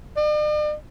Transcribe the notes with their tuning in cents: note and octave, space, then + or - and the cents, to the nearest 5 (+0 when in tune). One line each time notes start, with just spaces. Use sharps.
D5 +45